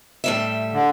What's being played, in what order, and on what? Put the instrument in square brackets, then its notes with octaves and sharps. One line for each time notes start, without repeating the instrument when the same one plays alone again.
[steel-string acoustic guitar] A2 G3 E5
[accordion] D3